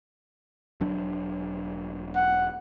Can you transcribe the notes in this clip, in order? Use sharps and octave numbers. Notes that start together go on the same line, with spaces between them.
E1 F#3 D4
F#5